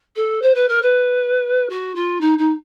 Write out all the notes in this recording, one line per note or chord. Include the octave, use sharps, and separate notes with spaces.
A4
C5
B4
A#4
B4
F#4
F4
D#4
D#4